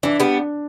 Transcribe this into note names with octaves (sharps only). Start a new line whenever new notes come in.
E3 D4
G3 B3